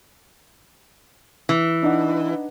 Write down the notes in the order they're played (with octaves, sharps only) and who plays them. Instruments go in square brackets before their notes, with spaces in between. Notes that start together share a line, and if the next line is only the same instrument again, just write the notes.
[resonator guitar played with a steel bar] E3
[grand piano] D4 D#4 F#5